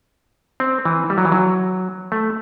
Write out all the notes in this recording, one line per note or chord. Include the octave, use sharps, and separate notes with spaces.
C4
E3
G3
F#3
E3
F#3
A3